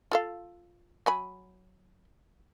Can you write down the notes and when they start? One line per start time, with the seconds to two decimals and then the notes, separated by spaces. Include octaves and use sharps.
0.11 F4 A4 F5
1.06 F#3 G#5 B5